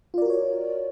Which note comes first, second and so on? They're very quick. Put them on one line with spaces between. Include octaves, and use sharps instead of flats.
F4 D5 A#4 F#4 C#5